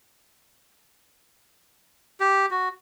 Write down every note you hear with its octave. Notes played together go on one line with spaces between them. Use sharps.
G4
F#4